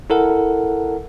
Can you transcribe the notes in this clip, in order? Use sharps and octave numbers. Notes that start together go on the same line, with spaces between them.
E4 A4 A#4 F#5